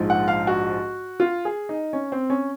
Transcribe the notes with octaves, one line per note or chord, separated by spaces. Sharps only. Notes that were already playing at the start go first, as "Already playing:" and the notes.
Already playing: A#1 G#2 F3 G#3
F#5
F5
F#4
F4
G#4
D#4
C#4
C4
C#4